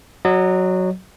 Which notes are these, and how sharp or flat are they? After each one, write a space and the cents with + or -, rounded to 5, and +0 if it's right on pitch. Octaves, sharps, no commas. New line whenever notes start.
F#3 +0 D#5 -35